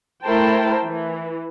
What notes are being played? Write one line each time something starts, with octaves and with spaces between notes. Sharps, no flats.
A3 E4 A#4 C5 G5 A5
E3